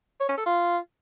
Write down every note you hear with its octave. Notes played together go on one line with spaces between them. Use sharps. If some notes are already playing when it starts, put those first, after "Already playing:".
C#5
C#4
A4
F4